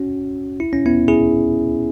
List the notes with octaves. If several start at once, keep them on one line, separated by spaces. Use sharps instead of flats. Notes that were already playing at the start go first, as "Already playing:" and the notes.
Already playing: C#4 F#4
E4
C#4
B3 E4
E4 G#4